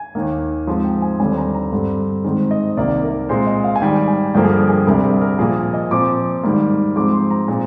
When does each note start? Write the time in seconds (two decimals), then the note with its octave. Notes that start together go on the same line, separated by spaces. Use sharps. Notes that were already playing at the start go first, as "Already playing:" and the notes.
Already playing: G#5
0.15 D#2 D#3 A#3
0.67 G#2 F3 G#3 C4
0.85 G5
1.02 G#5
1.20 D#2 D3 G3 C4 G#5
1.37 A#5
1.55 A#5
1.72 G2 D3 G3 C4
2.24 G#2 D#3 G#3 C4
2.51 D#5
2.77 C2 C3 D#3 A#3 D5
3.03 A#4
3.29 A#2 G#3 C4 C5
3.47 D#5
3.64 F5
3.76 G#5
3.81 G#2 D#3 G3 G5
4.08 G#5
4.34 G2 D3 F3 A#3 G5
4.44 G#4
4.52 A#4
4.69 G#4
4.86 D2 C3 G3 A#4
5.04 G#4
5.21 A#4
5.39 A#2 F3 A#3 G#4
5.74 D#5
5.91 A#2 F3 C4 D6
6.43 G#2 D#3 G3 A#3
6.96 G#2 F3 G#3 C4 D6
7.13 C6
7.31 A#5
7.48 A#2 G#3 C4